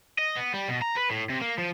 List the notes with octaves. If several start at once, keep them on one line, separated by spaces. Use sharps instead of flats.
D#5
B3
G3
B2
A#5
B4
A2
C3
A#3
F3